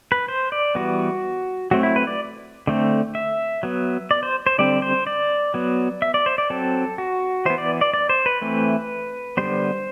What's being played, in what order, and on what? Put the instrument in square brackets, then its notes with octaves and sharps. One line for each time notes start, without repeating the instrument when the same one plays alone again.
[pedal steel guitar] B4
C5
D5
E3 G3 B3 F#4
F#3 A3 C4 F#4
E4
B4
D5
D3 A3 C4
E5
F#3 B3
D5
C5
C5
D3 G3 C4 D5
C5
D5
F#3 B3
E5
D5
C5
D5
F#3 C4 A4
F#4
E3 B3 C5
D5
D5
D5
C5
B4
E3 A3 C4
D3 G3 B3 C5